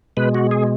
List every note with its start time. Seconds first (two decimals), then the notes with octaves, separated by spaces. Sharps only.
0.17 B2 G#3 B4
0.34 F#4
0.51 G#4